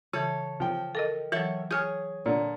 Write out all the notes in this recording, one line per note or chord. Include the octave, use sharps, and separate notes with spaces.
C#3 E3 A4 C#5
F3 G5
A4 A#4 D#5
E3 F#3 A4 C#5 E5
G#4 C#5 G#5 F6 G6
A#2 D3